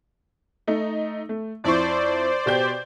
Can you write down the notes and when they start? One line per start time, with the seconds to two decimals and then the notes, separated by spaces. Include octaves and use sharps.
0.67 A3 D#4
1.29 A3
1.64 F2 E4 C5 D5 C#6
2.46 B2 G4 G6